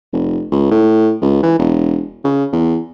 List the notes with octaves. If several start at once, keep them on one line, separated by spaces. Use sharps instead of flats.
F1
C#2
A2
C#2
E3
E1
C#3
E2